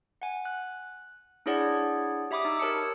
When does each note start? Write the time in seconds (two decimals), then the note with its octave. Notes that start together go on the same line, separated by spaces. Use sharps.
0.22 F#5 G#5
0.45 F#6
1.46 D4 E4 G#4 C#5 D5 F#5
2.31 G4 E5 B5 D6 D#6
2.45 D#4 E6
2.59 G4 A#4 C#5 A5 E6 C#7